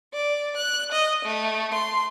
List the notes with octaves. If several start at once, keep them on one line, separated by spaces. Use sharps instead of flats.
D5
F#6
D#5
A3
C6